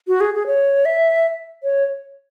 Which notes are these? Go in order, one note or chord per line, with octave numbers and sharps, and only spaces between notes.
F#4
G#4
G#4
C#5
E5
C#5